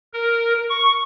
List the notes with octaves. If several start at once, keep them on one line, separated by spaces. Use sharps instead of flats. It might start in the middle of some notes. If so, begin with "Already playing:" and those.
A#4
C#6